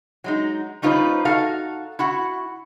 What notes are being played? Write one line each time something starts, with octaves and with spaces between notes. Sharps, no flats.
F#3 G#3 D#4
G3 C#4 D#4 F4 B4 C5
D#4 F#4 A4 F5
E4 F#4 F#5